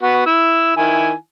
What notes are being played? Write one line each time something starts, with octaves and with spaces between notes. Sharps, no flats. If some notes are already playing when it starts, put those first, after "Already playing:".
B3 F#4
E4 E6
D#3 E4 G#5